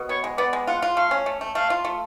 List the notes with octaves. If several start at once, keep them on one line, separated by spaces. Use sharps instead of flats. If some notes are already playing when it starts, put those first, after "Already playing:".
Already playing: B2
B3 C#5
G#3
B3 D5
G#3
F4 F#5
F4
A3 F5
C#4
A3
A3
A3 F5
F4
A3